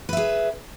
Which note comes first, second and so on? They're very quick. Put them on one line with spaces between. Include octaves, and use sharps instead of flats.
B4 E5 G#4